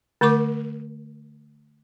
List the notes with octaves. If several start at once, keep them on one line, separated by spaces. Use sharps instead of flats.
D3 A3 A#4 C#6 D6